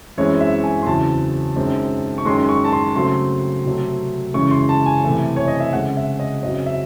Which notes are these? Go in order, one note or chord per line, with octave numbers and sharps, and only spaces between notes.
F#2 E3 G#3 C4 C#5
E5
G#5
C6
E2 C#3 F#3 C4 A5
F#2 D#3 G#3 C4
C#6
F#2 D#3 G#3 C6
C#6
A5
C6
C#3 F#3 A3 C4 C6
C3 F#3 A3 C4
F#2 C#3 E3 G#3 C#6
C6
A5
G#5
C3 E3 A3
C#5
D#5
E5
C#3 G#3 C4 F#5
E5
D#5
F#2 C#3 F#3 C4 D#5
E5